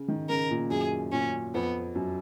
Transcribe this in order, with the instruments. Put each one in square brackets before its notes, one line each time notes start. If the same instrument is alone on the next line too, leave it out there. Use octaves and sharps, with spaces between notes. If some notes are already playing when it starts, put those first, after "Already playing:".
Already playing: [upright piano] C#3
D#3
[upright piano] C#3 [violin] A#4
[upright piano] A#2
[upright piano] F#2 [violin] G#4
[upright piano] A#2 [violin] C#4
[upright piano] F2 [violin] B3
[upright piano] F#2